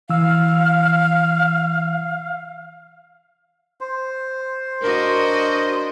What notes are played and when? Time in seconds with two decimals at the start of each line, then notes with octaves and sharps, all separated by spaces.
0.10 E3 F5 E6
3.81 C5
4.81 D4 F#4 A#4 D#5